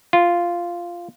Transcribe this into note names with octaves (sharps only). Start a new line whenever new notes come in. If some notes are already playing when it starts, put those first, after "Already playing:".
F4